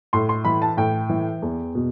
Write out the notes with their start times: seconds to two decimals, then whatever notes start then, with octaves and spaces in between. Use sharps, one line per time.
0.13 A2 C6
0.29 C6
0.45 E3 B5
0.62 A5
0.77 A2 G5
1.09 E3
1.42 E2
1.75 B2